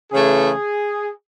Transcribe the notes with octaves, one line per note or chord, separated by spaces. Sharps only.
C#3 E3 A3 G#4